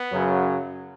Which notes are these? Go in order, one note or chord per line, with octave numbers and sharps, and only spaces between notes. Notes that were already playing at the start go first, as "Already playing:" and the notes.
Already playing: B3
F#2 C#3 F#3